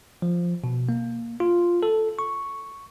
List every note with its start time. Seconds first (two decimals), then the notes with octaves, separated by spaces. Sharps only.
0.22 F3
0.64 B2
0.89 A#3
1.40 F4
1.83 A4
2.19 C#6